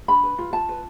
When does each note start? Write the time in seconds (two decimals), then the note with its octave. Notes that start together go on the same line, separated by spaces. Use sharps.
0.08 D4 B5
0.23 B4
0.39 F4
0.53 F4 A5
0.69 B4